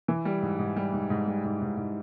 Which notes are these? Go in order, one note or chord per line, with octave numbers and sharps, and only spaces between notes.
E3
G3
G#2
G#2
G3
G#2
G#2
G3
G#2
G#2
G#2